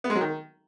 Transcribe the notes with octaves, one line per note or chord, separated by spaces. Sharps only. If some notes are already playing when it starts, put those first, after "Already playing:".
B3
G#3
F#3
D#3